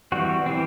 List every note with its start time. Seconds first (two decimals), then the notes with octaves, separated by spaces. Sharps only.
0.12 E3 G3 C4 F#4
0.46 E3 G3 C4